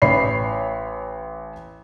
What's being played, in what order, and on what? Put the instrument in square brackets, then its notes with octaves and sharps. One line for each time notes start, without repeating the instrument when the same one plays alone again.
[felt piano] A1 C#5 B5 C7